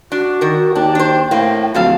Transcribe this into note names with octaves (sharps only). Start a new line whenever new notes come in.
D4 F#4
D#3 A#4
D#2 D4 G5
D4 C5
A2 A#3 C4
D1 F3 F#4 A4 F5